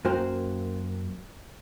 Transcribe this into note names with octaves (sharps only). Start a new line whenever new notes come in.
F#2 A#3 F#4 C5 G5 C6